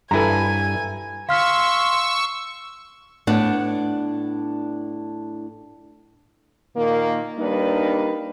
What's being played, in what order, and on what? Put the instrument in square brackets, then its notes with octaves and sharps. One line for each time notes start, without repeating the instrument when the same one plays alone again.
[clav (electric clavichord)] G2 E4 B4 [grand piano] A4 A#5 [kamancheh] G#5
[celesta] F5 F6 B6 [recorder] C6 [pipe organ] C#6 E6
[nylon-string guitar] A2 B3 D4 F#5
[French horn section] A#2 D#3 A#3
G3 A#3 D4 D#4 B4